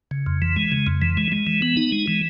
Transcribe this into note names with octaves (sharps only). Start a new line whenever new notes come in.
C#3
F2
E3
G#3
C#3
F2
E3
G#3
G#3
E3
B3
D#4
G#3
E3